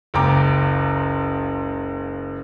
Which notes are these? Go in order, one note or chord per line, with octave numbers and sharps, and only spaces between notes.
F#1 C#2 G5 A#5 D6